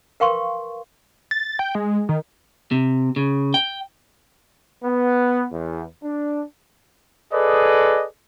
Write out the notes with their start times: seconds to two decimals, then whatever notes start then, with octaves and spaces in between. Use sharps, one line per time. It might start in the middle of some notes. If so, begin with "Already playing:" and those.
0.20 A#4 B4 F5 G5 C6 C#6
1.31 A6
1.59 G5
1.75 G#3
2.09 D#3
2.71 C3
3.16 C#3
3.54 G5
4.84 B3
5.52 E2
6.03 D4
7.32 G#4 A4 B4 D5 D#5